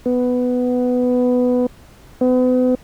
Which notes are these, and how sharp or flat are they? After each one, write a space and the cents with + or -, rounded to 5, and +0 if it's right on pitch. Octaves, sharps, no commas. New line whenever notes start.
B3 +10
B3 +40